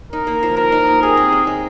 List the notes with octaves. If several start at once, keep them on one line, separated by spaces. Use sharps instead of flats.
D#4 A#4
A#3
F3
F3 A#4
D#4
A#3
G4 G#4
C4
G#3
G#3